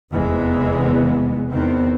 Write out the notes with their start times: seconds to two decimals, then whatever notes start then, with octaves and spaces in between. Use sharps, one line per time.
0.13 F1 E2 E3 G#3 B3
1.49 E2 D#3 B3 C4